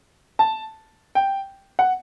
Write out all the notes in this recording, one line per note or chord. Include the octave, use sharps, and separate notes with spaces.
A5
G5
F#5